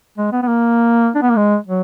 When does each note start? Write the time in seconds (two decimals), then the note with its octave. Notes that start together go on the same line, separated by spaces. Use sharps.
0.18 G#3
0.32 B3
0.43 B3
0.48 A#3
1.15 D4
1.22 B3
1.30 A#3
1.36 G#3
1.67 F#3